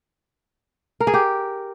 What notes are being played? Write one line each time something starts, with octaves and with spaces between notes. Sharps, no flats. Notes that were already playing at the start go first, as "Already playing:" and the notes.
A#4
G#4
G4